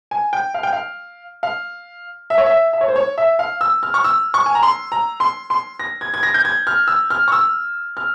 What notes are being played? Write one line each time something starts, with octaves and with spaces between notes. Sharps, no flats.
G#5
G5
F5
G5
F5
F5
E5
C#5
E5
E5
C#5
C5
C#5
E5
F5
E6
F6
C#6
E6
C#6
G#5
A#5
C6
A#5
C6
C6
A#6
G#6
G#6
A#6
G6
G#6
F6
E6
F6
C#6
E6
F6